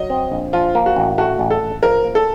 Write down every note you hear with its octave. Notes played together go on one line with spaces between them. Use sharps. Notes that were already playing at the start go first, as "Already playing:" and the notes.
Already playing: F#3 D#5
C4
A#1
F3 F4
A#3
F#4
A1
A3 F#4
A1
A4
A1
F3 A#4
A#3
A4